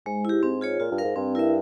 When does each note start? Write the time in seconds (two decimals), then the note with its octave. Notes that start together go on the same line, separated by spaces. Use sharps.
0.06 G#2 G#3
0.25 E4 G4
0.43 G#2 C4
0.61 F4 G#4 C#5
0.80 A#2 F4
0.91 G2
0.98 A#4 F5
1.04 G#2
1.16 G2 C4
1.35 E4 A#4 E5